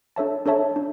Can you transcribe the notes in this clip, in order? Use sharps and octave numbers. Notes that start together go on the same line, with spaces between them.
D4 A4 C#5 E5 A5
D4 A4 C#5 E5 A5
D4